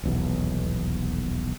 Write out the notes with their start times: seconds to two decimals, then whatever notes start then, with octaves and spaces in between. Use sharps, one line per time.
0.03 D#1 B1 E2